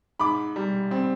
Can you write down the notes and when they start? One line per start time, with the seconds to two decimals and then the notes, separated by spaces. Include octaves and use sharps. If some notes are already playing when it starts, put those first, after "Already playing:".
0.19 G#2 B5 D6
0.56 G3
0.91 C4